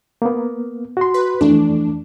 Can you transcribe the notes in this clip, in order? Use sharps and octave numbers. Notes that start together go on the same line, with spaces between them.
A#3 B3
F#4 C6
B4
F2 E3 A3 D4